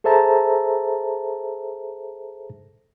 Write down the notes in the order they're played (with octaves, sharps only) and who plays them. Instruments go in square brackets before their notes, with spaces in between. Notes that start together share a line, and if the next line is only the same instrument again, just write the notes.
[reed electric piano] G#4 A4 C5 E5 A5 A#5